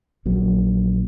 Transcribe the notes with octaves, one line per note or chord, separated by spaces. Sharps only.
A#1 A#2 F#3